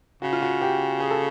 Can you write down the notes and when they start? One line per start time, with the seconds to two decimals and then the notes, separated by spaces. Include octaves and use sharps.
0.22 C#3 F#4
0.33 F4
0.42 F#4
0.62 G4
1.00 G#4
1.11 A4